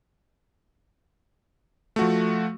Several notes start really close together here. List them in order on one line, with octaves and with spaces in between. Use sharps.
A3 F#4 F3